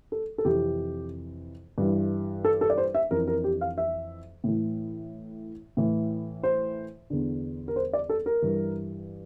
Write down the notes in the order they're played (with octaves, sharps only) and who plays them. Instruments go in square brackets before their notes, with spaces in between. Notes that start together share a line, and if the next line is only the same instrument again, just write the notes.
[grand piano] A4
A4
F2 C3 E3 G4
G2 E3
A4
A4
D5
C5
E5
F2 E3 A#4
A#4
G4
F5
E5
A2 E3
A2 E3
C5
E2 D3
A#4
C5
D5
A4
A#4
G2 E3